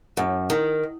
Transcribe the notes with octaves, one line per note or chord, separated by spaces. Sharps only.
F#2
D#3